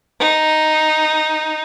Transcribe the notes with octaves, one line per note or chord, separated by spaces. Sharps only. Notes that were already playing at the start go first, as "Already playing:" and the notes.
D#4